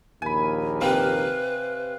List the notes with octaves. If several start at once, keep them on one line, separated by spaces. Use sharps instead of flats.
A#1 D#2 A#4 G#5 B5
C3 C4 B4 F5